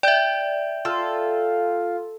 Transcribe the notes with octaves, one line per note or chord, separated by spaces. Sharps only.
D5 E5 G5 G6
F4 A4